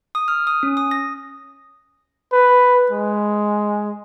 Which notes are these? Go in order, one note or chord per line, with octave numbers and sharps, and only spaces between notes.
D#6
F6
D#6
C#4
D#6
A#6
B4
G#3